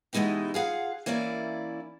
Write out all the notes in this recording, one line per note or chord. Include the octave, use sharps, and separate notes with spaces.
B2 E3 G#3 D#4 E4 G4
F4 G#4 F5 F#5
E3 A#3 C#4 E4 D5